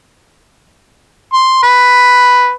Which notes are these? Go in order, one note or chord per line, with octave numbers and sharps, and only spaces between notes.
C6
B4